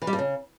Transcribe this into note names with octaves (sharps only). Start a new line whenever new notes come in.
E3
G3
G2
C#3